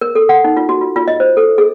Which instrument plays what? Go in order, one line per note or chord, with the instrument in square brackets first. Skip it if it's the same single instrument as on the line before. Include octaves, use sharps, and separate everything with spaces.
[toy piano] A#4
A4
F#5
D#4
F4
F#4
F4
F4
D#5
C5
A4
G#4